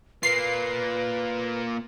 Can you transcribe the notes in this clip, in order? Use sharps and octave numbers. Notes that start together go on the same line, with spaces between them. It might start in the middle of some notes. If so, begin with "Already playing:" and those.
A#3 F4 B4 C7